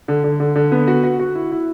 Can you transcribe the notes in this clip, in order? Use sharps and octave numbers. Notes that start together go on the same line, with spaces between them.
D3
D3
D3
D3
B3
F#4
F#4
F#4
E4
E4